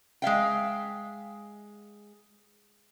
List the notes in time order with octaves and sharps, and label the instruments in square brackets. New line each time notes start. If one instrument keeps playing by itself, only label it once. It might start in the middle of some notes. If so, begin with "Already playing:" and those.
[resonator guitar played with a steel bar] G#3 E5 F5 G5